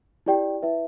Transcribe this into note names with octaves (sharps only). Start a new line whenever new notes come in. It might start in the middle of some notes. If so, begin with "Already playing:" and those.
E4 G4 D5 G5
E4 B4 E5